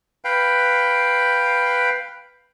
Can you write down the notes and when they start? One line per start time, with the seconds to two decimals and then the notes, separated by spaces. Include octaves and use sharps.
0.25 B4 F5 G5